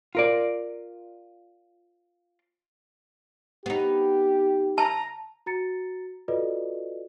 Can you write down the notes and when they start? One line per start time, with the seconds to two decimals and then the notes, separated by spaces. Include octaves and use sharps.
0.15 F4 A#4 D5
3.66 B3 D#4 G4
4.78 A5 A#5
5.46 F#4 A#5 A6 C#7
6.28 F4 F#4 A4 B4 D5 D#5